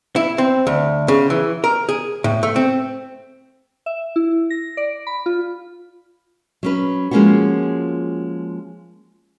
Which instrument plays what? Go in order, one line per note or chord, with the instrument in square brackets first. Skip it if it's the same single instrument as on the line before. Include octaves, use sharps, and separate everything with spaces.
[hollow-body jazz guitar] E4
C4
D2
C#3
E3
A#4
G#4
A2
A3
C4
[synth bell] E5
E4
A#6
D5
B5
F4
[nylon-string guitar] F#3 C#4 B4
F3 G#3 A#3 C#4 F4 F#4